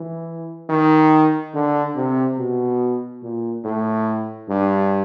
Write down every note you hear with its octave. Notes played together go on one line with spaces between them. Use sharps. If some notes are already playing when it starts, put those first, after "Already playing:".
Already playing: E3
D#3
D3
C3
B2
A#2
A2
G2